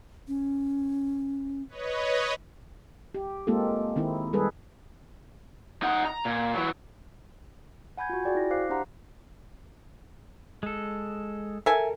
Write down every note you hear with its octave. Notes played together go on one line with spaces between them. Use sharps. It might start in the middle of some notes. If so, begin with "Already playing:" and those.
C#4
B4 C#5 D#5
G4
G#3 A#3 C4 F4 G4 A4
D#3 C4 D#4 E4
G3 G#3 G#4 A4 B4
D#4 F#5
A#5
A#2
E3 F#3
F#5 G#5 B5 G6 G#6
F4 F#4
F#4 G#4 D5 G5 G#5
E4 A#6
C5 F5 D6 F#6 C7
D4 G4 C5 F#5 A#5 C6
G#3 A4
A4 A#4 E5 G#5